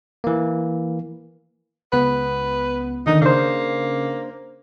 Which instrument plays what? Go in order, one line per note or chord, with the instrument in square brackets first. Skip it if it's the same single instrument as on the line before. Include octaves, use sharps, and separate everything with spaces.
[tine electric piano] E3 A#3
[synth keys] C#2 B3 [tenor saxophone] B4
[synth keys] D3 D#3 [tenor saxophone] D#4
[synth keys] C#3 [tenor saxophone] A#3 [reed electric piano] D4 C5